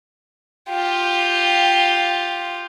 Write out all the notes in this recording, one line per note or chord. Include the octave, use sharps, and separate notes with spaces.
F4 G4